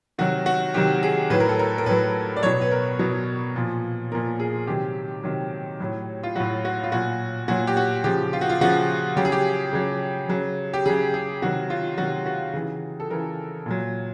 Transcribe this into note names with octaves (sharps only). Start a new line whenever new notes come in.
C3 D#3 F#3 F#4
F#4
C3 D#3 F#3 G4
G#4
A2 F#3 B4
A#4
A4
A#4
A#4
A2 F#3 B4
D5
B2 F#3 C#5
B4
A#4
B2 F#3
A#2 F3
A#2 F3 A#4
G#4
C3 D#3 F#3 G4
C3 D#3 F#3
A2 F#3
F4
A2 F#3 F#4
F#4
F4
A#2 F#3 F#4
A#2 F#3 F#4
G4
F#4
C#3 F3 G4
F4
F#4
F4
C#3 F3 F#4
C#3 F#3 G4
G#4
G4
C#3 F#3
C#3 F#3
G4
C#3 F#3 G#4
G#4
C3 D#3 F#3 F#4
F4
C3 D#3 F#3 F#4
F#4
C#3 E3
A4
C#3 E3 A#4
A#2 F#3